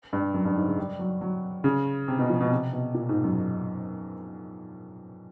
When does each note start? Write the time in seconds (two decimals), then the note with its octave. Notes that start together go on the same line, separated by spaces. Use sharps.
0.13 G2
0.34 F#2
0.45 G2
0.56 G#2
0.67 C#3
0.78 G3
0.99 F#3
1.21 F#3
1.64 C#3
2.08 C3
2.19 B2
2.30 F3
2.40 B2
2.51 C3
2.73 B2
2.94 A#2
3.09 G#2
3.24 F#2